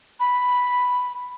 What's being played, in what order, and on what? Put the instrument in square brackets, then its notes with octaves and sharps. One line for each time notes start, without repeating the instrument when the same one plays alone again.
[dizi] B5